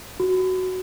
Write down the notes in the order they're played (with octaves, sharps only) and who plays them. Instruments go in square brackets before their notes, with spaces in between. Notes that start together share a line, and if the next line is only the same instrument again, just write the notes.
[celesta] F#4